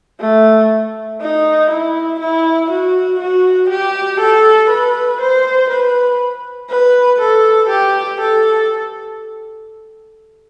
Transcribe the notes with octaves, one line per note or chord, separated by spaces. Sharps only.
A3
D#4
E4
E4
F#4
F#4
G4
A4
B4
C5
B4
B4
A4
G4
A4